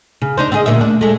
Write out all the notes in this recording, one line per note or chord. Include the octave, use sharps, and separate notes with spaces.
C#3
D4 D#4 C5
C4 G#4 D#5
D2 A#2 E5
D4
G#3 A3